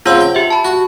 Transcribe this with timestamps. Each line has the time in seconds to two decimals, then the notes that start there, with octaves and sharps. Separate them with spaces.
0.06 C#3 C4 F4 F#5 E6
0.21 G5
0.35 G4 E5
0.50 A5 B5
0.65 F#4